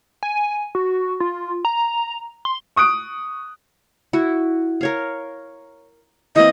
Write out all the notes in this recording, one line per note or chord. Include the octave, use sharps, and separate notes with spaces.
G#5
F#4
F4
A#5
C6
C#6 D#6 F#6 D7
E4 F#4
A#4 C#5 F5
E3 A#3 C4 D#5